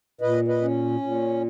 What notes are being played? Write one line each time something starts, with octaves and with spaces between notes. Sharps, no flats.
A#2 B4 D#5
B4 D#5
C#4
A#2